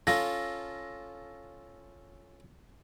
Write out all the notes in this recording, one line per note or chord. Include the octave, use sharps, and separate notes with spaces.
C#4 F4 A4 A#6